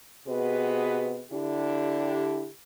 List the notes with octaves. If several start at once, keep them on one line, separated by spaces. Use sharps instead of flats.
C3 B3 F#4 G#4 B4 D#5
D3 D4 E4 G4